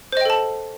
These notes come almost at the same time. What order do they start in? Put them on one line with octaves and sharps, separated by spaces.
C5 D#5 G5 A4 A5